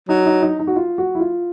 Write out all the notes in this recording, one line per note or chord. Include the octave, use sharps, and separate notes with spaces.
F#3 D#4
D#4
D#4
D#4
F#4
F4
F#4
E4
F4